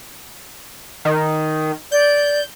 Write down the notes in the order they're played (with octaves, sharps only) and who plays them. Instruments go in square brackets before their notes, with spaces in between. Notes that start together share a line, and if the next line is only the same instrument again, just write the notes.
[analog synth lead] D#3
[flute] D5 [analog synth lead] G6